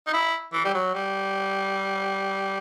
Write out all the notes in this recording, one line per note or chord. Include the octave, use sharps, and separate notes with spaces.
D#4
E4
E3
G3
F#3
G3